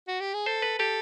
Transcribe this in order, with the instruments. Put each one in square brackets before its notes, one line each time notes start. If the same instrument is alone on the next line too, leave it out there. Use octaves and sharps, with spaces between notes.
[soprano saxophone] F#4
G4
G#4
[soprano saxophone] A4 [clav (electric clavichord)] C5
[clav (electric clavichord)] B4
[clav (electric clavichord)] G4 [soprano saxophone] A4